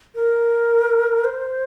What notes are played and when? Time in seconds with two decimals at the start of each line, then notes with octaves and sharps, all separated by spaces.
0.15 A#4
1.24 C5